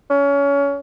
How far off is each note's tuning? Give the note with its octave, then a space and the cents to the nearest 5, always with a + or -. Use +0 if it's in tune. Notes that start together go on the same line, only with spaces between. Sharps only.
C#4 +25